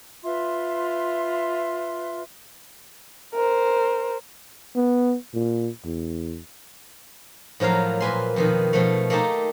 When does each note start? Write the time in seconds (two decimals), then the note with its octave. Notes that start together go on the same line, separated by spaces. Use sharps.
0.24 F4 B4 E5 C6
3.34 A#4 C5
4.75 B3
5.34 A#2
5.85 E2
7.60 A2 F3 F#3 A#4 F5
8.00 A#2 B4 G#5 C6
8.36 F2 B2 D#3
8.73 B2 F3 A3
9.10 A3 A#3 D#4 G4 A5